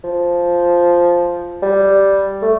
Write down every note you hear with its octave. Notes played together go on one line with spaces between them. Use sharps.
F3
G3
A3